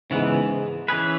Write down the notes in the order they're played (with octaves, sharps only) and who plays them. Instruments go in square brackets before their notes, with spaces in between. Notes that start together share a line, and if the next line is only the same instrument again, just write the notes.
[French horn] G#2 [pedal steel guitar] C#3 E3 B3
[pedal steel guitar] E3 C#4 G#4 B4